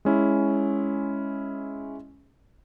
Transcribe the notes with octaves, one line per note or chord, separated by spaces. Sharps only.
G#3 C#4 E4